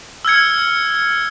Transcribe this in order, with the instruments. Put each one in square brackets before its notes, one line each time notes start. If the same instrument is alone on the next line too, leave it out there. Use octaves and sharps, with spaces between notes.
[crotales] E6 F6 G#6 C#7